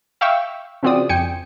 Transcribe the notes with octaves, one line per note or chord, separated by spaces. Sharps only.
E5 F5 G5 C#6 E6
C#3 F3 C4 F#4 D5 D#6
F2 G5 G#5 C#7